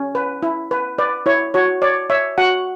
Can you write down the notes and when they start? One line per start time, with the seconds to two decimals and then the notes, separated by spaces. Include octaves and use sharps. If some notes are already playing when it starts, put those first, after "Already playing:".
Already playing: C#4
0.15 B4
0.43 E4
0.71 B4
0.98 B4 D5
1.26 E4 C#5
1.54 F#4 C#5
1.82 C#5 D5
2.10 C#5 E5
2.38 F#4 F#5